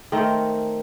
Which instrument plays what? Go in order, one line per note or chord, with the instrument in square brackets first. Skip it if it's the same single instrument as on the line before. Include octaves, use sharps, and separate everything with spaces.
[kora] D#3 A3 C4 A#4